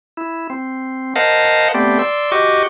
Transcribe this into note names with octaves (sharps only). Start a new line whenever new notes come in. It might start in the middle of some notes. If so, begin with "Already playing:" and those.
E4
C4
A#4 C5 D#5 F5 F#5 A5
A3 B3 C4 G4 D5
D5 C6 E6
F#4 G4 D#5 C#6 D6